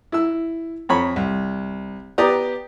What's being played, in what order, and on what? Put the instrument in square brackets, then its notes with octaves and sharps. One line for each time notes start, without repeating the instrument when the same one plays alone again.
[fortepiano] E4 E6
F2 C#5 B5
C2
B3 G4 D5 A#5 D#6